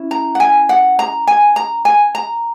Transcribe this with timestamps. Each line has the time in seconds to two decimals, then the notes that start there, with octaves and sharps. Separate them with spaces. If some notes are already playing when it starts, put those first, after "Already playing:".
Already playing: C#4 E4
0.11 A#5
0.35 F#5
0.40 G#5
0.69 F#5
0.99 A#5
1.27 G#5
1.56 A#5
1.85 G#5
2.15 A#5